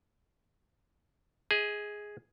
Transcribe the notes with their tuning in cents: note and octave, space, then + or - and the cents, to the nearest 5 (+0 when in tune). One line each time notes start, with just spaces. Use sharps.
G#4 +0 D#5 +40